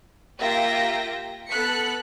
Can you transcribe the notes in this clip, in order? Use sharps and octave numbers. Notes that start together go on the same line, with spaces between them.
A#3 F4 G4 E5 G5 A#6
B3 A4 F#6 B6 C#7